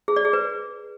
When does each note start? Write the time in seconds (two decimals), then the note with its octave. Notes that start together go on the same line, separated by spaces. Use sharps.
0.08 G#4
0.16 D5
0.25 G#4
0.33 B4